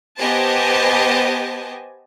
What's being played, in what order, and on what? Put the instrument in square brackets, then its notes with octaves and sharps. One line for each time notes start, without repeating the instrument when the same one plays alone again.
[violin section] B3 G4 C5 D#5 G#5 A5